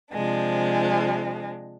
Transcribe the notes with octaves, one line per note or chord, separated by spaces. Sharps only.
C3 F3 G#3 D4